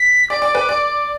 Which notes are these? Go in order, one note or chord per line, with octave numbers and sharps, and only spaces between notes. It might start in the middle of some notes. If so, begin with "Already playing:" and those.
Already playing: B6
D5 D6
D5
B4
D5